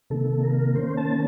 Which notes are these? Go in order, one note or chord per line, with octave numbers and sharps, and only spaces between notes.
C3 D#3 A#3 A4
A#4
D#3 A#3 C#4 C5
A5